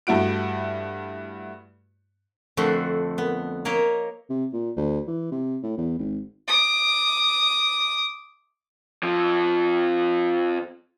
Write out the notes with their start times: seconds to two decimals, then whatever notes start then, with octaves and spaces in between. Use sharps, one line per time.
0.07 G2 A3 E4 F#4 D7
2.57 F2 D3 A3 F#4 F#5 C6
3.18 B3
3.65 A#3 A#4 C#5 D#5 E5
4.30 C3
4.53 A#2
4.77 D2
5.07 E3
5.32 C3
5.63 A2
5.78 E2
5.99 G#1
6.48 D6 D#6
9.03 F2 F3